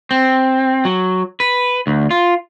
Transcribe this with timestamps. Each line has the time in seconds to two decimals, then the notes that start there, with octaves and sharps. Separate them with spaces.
0.11 C4
0.85 F#3
1.40 B4
1.87 D2
2.11 F4